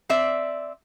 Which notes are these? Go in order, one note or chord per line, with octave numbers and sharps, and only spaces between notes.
C4 D5 E5